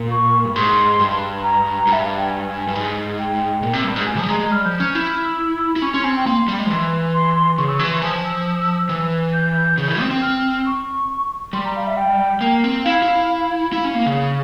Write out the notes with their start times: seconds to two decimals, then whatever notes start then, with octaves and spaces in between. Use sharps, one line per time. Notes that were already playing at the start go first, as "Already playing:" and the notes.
Already playing: A#2
0.11 C#6
0.45 G2
0.55 G#2 C6
0.99 G2
1.43 A#5
1.87 G2
1.93 E5
2.05 F5
2.18 G5
2.30 G#5
2.68 G2
2.75 G#2
3.19 G5
3.63 A#2
3.73 C3
3.84 G2
3.96 G#2
4.06 G#2 G#5
4.18 F3
4.23 G3
4.29 G#3 A#5
4.39 G#3
4.51 G3 F6
4.65 F3 G6
4.80 C#4 F6
4.94 E4 G6
5.09 F6
5.24 E6
5.76 E4
5.82 C#4 C#6
5.93 C#4 C6
6.04 C4 G#5
6.16 G5
6.26 A#3 C6
6.48 G3
6.59 G#3
6.66 F3
6.70 E3
7.14 C6
7.36 C6
7.57 C#3 C#6
7.69 E6
7.79 E3 C#6
7.91 C6
8.02 F3 G#5
8.25 E6
8.89 E3
9.33 G6
9.78 C#3
9.88 E3
10.00 C4
10.11 C4
10.22 F6
10.66 C#6
11.53 G3 C6
11.65 A#5
11.76 F5
11.87 E5
11.97 G5
12.41 A#3
12.64 C4
12.85 E4 F5
13.02 E4
13.73 E4 F5
13.85 C#4
13.95 A#3
14.06 C#3